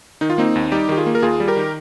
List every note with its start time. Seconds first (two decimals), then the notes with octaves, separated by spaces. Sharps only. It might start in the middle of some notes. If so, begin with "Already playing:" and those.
0.21 D#3 D#4
0.30 F4
0.38 A#3 C4 D#4
0.56 D#2
0.72 G3 D#4 G4
0.89 D#3 G4
0.97 F4 G#4
1.06 A#3
1.15 A#4
1.22 D#2 F4 G#4
1.40 G3
1.48 G4 A#4
1.57 D#3